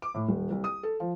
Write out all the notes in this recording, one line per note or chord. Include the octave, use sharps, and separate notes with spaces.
D6
A2
D#1
C2
D#6
A4
F3